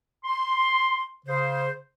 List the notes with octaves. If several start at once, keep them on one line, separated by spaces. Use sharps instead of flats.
C6
C#3 C5